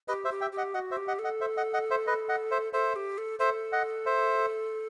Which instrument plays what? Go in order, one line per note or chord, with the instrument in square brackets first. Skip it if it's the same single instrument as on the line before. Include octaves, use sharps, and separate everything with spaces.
[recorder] G4 [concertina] B4 D#5
[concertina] C5 E5
[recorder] G4
[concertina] E5 G5
[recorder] G4
[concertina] D#5 F#5
[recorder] F#4 [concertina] D#5 F#5
[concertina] C5 E5
[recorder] G4
[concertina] D#5 F#5
[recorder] A4
[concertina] D#5 F#5
C5 E5
D#5 F#5
D#5 F#5
C5 E5
B4 D#5
D#5 F#5
C5 E5
[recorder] A4 [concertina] C5 E5
[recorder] G4
A4
[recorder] A4 [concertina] C5 E5
[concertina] D#5 F#5
C5 E5